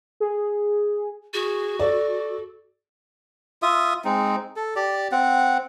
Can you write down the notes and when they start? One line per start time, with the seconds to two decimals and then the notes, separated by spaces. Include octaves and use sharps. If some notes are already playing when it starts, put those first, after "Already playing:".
0.20 G#4
1.34 F#4 G#4
1.79 A4 D5
3.62 F4 E5 D#6
4.05 G#3 C4 D#4
4.56 A4
4.76 G4 D5
5.12 C4 F#5